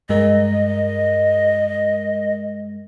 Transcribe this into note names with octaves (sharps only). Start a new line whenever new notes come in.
G2 G#3 A#4 D#5